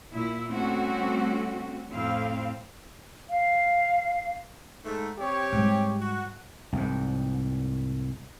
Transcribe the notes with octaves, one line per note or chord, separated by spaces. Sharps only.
A#2 E4
G3 A3 C4 C#4 F#4
F2 A2 C4 E4 F5
F5
G#2 A3
C4 G4 C#5
G#2 G3
F#4
C2 G#2